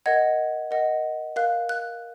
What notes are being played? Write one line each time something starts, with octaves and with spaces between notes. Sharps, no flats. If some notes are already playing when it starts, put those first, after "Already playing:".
A#4 D#5 F#5 G#6
A#4 D#5 F#5
A#4 F5 F#6
F#6